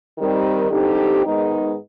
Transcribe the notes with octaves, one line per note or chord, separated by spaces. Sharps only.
D#3 G3 C4
D3 G3 C4 D#4 G4
G#2 D#3 G#3 B3 D#4